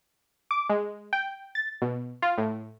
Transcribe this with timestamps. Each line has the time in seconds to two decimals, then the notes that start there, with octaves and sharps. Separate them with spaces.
0.51 D6
0.70 G#3
1.13 G5
1.55 A6
1.82 B2
2.22 F4
2.38 A2